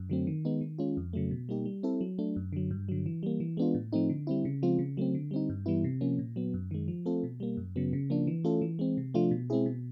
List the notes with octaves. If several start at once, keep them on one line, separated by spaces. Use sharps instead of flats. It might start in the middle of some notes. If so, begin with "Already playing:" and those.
Already playing: F#2
D3 F#3 A3 C4
D#3
G#3 B3 D#4
D#3
G#3 C#4 F4
F2
C#3 F#3 A3
B2
G3 A#3 D#4 G4
G3
C4 E4 A4
F#3
A3 D4
F#2
D3 F#3
G2
D3 F#3
E3
G3 A#3
E3
G#3 B3 D4 F4
A2
F3 A3 C4 D#4
D3
G3 C4 E4
C#3
F3 G#3 C4 F4
C#3
F#3 A3 C4
D3
G3 C4 D#4
G2
E3 G3 B3 E4
C3
F3 A#3 C#4
A#2
F#3 B3
F#2
D#3 G#3
F3
A3 C4 F4 A4
B2
G3 A#3
F#2
C#3 F#3 B3
C#3
F3 A#3 D4
E3
A3 C#4 F4 A4
E3
G#3 C4
C3
F3 A3 D4 F4
B2
G#3 C4 E4 G#4
B2